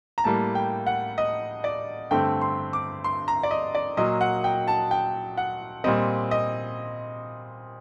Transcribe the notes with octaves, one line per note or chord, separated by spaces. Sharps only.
A#5
A2 G3 A#3 A5
G5
F#5
D#5
D5
G2 D3 A3 C4 G5
C6
D6
C6
A#5
D5
D#5
D5
A#2 F#3 A#3 D#5
F#5
G5
A5
G5
F#5
A#2 G3 C4 D#5
D#5